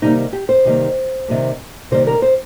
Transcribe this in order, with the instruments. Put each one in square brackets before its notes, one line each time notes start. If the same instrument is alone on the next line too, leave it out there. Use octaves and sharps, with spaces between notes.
[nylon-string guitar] C3 D#3 G3 A#3 D#4
G4
C5
C3 D#3 G3 A#3
C3 D#3 G3 A#3
C3 D#3 G3 A#3 C5
A#4
C5